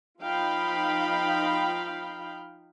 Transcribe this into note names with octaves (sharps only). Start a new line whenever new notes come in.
F3 D#4 F5 G5 B5